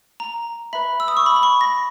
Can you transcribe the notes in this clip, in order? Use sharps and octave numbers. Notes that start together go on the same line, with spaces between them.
A#5
B4 E5 B5
E6
D#6
C#6
B5
B5
C#6
A#6